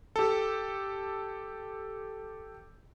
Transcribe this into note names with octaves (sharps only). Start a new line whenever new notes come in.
G4 A4